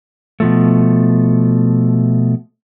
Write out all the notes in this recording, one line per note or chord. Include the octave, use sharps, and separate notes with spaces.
B2 F3 A3